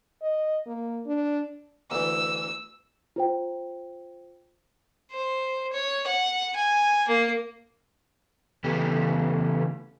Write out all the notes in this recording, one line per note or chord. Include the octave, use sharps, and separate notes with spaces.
D#5
A#3
D4
D2 E3 E6
F4 C5 G5
C5
C#5
F#5
G#5
A#3
C#3 E3 A3 B3 G4